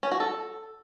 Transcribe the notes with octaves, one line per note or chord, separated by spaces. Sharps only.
C#4
F#4
A4